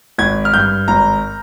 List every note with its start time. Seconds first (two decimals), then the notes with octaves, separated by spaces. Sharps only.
0.18 G#1 G#6
0.45 F6
0.53 G2 G6
0.88 G#1 A#5